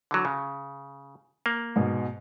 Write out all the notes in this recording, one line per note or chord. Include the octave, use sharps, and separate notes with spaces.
D3 E3 F#3
C#3
A#3
G#2 B2